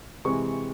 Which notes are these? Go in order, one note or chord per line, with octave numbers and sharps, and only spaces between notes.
C3 E3 G#3 C4 C#6